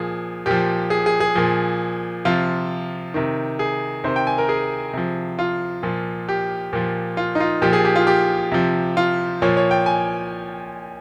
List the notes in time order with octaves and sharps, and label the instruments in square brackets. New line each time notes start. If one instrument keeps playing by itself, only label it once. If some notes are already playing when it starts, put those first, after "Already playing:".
Already playing: [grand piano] A#2 F3 G#4
A#2 F3 G4
G#4
G#4
G#4
A#2 F3
C3 F3 F4
C3 D#3
G#4
C3 D#3 C5
G5
G#5
A#4
G#4
C3 F3
F4
A#2 F3
G4
A#2 F3
F4
D#4
F4
A#2 F3 G4
G#4
G4
F4
G4
C3 F3
F4
A#2 F3 C#5
C#5
G5
G#5